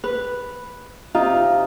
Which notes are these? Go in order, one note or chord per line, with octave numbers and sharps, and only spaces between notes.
B4
C3 D#4 F4